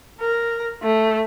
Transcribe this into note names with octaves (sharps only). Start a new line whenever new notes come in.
A#4
A3